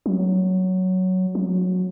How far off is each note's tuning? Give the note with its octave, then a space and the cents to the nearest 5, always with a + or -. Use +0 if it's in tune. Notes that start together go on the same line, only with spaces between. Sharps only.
F#3 +5
F#3 -20